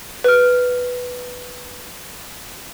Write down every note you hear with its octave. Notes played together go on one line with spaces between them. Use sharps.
B4 F6